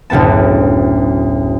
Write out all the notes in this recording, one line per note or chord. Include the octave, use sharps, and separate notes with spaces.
F#1 D2 A2 B3 A5